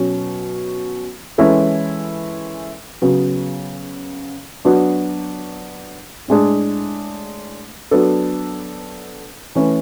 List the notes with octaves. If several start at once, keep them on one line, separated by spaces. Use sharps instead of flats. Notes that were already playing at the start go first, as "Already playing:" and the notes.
Already playing: B2 F#3 C#4
E3 G#3 C#4 E4 A4
C#3 F#3 B3
F#3 B3 D4 F#4
A2 G#3 D4 G#4
F#3 B3 D4 A4
E3 A3 C#4